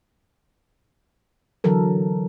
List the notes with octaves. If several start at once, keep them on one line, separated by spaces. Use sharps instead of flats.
D3 E3 F#3 A4 A#4